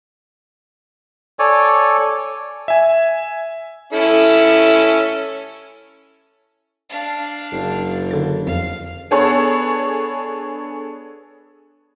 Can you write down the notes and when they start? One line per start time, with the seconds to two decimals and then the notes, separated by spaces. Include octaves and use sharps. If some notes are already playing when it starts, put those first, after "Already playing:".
1.39 A4 C#5 D5 G#5
2.68 E5 G#5
3.93 C#4 E4 A4
6.89 D4 F5
7.52 F#1
8.11 D3 A6
8.47 F2 F5
9.11 B3 D4 G#4 A4 C#5